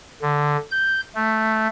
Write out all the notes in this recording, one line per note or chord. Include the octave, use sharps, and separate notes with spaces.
D3
G6
A3